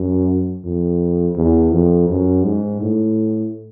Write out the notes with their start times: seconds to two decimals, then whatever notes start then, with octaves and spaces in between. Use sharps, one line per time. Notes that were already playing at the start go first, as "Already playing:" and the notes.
Already playing: F#2
0.64 F2
1.36 E2
1.72 F2
2.09 F#2
2.45 G#2
2.81 A2